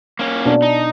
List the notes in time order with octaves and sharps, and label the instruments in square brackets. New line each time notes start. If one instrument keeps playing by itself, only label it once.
[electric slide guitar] A#3 C#4
[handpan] B2 D4
[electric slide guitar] D#4